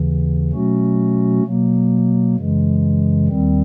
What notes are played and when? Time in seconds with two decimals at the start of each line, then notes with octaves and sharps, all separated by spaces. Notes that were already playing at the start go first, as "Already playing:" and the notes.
Already playing: D#2 C#3 E3
0.51 B2 F#3 A3 C#4 F#4
1.44 B2 F#3 A#3
2.35 F#2 C#3 E3 G#3
3.28 D#2 D#3 G3 C4